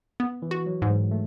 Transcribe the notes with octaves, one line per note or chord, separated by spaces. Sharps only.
B3
E3
F#4
F#3
G#2
G#3
A3